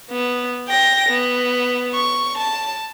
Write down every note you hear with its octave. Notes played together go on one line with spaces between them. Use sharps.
B3
G5 A#6
B3
C#6
A5